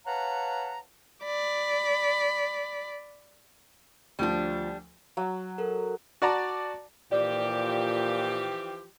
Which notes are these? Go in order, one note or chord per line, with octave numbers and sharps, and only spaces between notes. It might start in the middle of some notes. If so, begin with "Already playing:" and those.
B4 C#5 F5 F#5 A5 A#5
D5 B5
D2 F3 G3 D4
F#3
A4 A#4
F#4 D5 A5 A#5
A#2 E3 F3 G4 D5